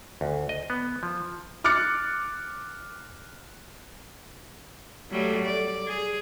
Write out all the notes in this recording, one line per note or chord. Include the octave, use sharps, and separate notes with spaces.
D2
D#5
B3
F3
D6 F6 F#6 A6 C#7
F#3 G3 A3
D5
G#4